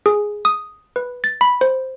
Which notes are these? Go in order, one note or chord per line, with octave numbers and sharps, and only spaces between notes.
G#4
D#6
B4
A6
B5
C5